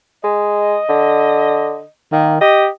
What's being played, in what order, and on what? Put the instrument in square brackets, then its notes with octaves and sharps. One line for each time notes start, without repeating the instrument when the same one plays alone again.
[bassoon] G#3 [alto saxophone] D#5
[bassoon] D3
[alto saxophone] D#3 [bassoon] A#3
[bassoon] G4 [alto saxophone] D#5